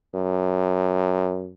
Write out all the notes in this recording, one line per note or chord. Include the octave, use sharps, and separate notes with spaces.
F#2